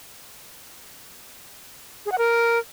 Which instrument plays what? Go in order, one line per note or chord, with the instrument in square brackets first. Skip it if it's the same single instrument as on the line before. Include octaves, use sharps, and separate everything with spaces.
[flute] G#4
F#5
A#4